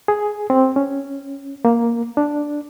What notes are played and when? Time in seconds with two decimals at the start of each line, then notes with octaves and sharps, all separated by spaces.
0.08 G#4
0.50 C4
0.76 C#4
1.65 A#3
2.17 D4